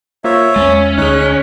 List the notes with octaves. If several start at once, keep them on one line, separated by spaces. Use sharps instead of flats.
A#3 F4 C5 C#5 E5
E2 G#3 C#4 A6
D2 D#4 G#4 C#5 F#6